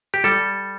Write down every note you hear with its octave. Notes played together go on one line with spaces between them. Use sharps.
G4
G3 A4